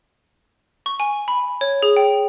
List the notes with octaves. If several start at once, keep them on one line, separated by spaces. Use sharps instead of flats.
C#6
G#5
B5
C#5
G#4
G5